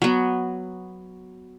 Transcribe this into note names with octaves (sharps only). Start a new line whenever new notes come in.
F#3 B3